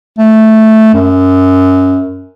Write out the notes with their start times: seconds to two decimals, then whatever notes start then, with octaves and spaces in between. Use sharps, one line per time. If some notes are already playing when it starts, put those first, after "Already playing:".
0.18 A3
0.94 F#2